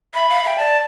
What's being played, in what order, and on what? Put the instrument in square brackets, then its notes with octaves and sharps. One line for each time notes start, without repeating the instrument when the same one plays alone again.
[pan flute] E5 [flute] B5
[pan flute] F5
[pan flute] E5 [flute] G5
[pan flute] D5 [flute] A5